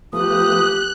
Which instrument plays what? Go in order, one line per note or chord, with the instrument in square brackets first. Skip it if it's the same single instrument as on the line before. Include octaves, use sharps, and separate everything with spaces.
[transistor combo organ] F3 A3 B3 [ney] G4 [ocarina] D#6 [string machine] F#6